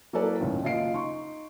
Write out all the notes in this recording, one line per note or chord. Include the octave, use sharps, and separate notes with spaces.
F#3 A#3 E4 A4 B4 D5
C#2 F#2 A2 D#3
F#1 F4 D#5 C7 D7
D#4 C6 C#6